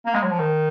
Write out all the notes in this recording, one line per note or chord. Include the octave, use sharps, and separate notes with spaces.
A#3
G#3
F#3
F3
D#3